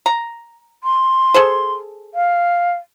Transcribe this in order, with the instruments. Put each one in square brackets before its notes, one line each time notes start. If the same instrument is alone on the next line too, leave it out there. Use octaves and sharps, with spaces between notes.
[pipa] A#5
[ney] C6
[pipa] G#4 A4 C5
[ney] F5